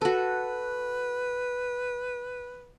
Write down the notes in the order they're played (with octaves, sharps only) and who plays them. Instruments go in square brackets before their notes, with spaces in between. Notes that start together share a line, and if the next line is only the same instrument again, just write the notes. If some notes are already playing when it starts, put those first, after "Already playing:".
[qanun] F#4 A4 [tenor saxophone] B4